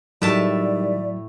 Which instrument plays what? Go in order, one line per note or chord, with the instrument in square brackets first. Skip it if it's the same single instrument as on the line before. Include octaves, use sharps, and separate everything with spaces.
[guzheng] A2 E5 A5 [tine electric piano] D#3 G3 [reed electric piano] F#3 [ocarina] D5